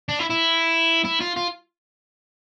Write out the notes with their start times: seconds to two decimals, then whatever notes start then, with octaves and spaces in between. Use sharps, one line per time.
0.09 D4
0.19 E4
0.30 E4
1.05 E4
1.21 F4
1.37 F4